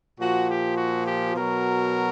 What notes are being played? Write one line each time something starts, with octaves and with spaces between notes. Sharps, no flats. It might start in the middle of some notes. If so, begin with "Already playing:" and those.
A#2 F3 F#4
G4
F#4
G4
B2 F#3 A#4